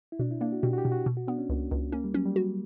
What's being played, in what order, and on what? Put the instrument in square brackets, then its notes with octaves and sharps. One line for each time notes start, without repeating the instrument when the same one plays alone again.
[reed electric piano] E4
[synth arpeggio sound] B2 [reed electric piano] D4
[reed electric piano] E4
[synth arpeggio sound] A#3 [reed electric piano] D4
[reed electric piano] F#4
[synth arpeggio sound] B2 [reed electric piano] G4
[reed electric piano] F#4
G4
[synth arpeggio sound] B2
[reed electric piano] F#4
[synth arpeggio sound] B2
[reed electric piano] F#4
[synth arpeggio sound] B3 [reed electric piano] D4
[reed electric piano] C#4
[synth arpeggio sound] C#2 [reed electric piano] A#3
[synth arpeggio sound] C#2
[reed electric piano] A#3 [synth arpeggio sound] C#4
[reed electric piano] G3
[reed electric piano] F#3 [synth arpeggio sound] C#4
[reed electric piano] G3
[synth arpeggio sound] F#4